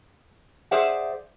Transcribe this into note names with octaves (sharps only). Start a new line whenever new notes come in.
G#4 C5 D5 E5 F#5